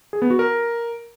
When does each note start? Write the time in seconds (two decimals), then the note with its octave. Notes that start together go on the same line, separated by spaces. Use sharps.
0.13 G#4
0.22 B3
0.30 F#4
0.39 A#4